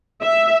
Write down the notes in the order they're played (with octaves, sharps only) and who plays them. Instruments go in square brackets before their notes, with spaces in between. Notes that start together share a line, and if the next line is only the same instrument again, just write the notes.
[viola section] E5